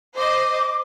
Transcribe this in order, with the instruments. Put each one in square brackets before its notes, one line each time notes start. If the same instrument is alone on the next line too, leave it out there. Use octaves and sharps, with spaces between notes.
[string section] C5 D#5 [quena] D6